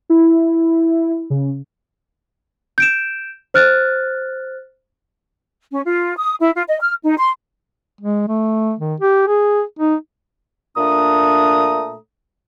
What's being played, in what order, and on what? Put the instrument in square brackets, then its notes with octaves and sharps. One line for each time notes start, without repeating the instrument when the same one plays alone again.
[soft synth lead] E4
C#3
[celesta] G6 D7 E7
C5 F6 F#6 A6
[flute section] C#4
F4
D#6
E4
F4
D#5
F6
D#4
C6
[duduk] G#3
A3
D#3
G4
G#4
D#4
[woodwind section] A#2 A3 D4 A#5 D#6